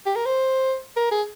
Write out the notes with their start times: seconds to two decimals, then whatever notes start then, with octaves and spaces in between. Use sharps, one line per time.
0.06 G4
0.16 A#4
0.26 C5
0.97 A#4
1.11 G#4